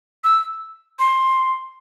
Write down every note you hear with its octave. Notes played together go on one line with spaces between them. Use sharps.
E6
C6